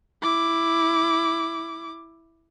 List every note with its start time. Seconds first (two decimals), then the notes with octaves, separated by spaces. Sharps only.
0.22 E4 D6